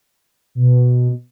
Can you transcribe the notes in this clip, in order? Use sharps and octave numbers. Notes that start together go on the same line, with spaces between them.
B2